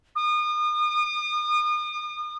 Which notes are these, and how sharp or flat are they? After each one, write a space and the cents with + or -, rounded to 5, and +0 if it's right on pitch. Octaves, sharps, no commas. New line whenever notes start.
D#6 -40